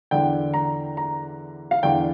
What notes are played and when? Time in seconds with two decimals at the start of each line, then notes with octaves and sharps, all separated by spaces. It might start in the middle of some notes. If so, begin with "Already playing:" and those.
0.11 E2 D3 G5
0.54 A#5
0.97 A#5
1.71 F5
1.83 E2 D3 G5